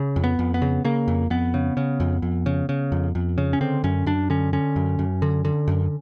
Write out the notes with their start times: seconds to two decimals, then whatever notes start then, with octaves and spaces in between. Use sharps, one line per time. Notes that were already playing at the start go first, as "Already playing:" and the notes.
Already playing: C#3
0.16 F2
0.24 B3
0.39 F2
0.54 B3
0.62 C#3
0.84 C#3 A#3
1.08 F2
1.30 F2 B3
1.54 C#3
1.77 C#3
2.00 F2
2.22 F2
2.46 C#3
2.69 C#3
2.92 F2
3.15 F2
3.38 C#3
3.53 C#4
3.61 D3 C4
3.84 F#2 C#4
4.06 F#2 D4
4.30 D3 C#4
4.53 D3 C#4
4.76 F#2
4.99 F#2
5.22 D3
5.45 D3
5.68 F#2